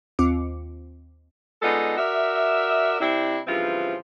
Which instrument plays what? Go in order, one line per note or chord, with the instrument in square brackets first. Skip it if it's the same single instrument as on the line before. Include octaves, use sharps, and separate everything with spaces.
[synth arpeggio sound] D#2 C4 F4 D6 C#7
[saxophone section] G#3 B3 D4 D#4 F4 A4
F#4 A#4 D5 E5
C3 C4 D4 E4
G2 C#3 E3 F3 C4 F4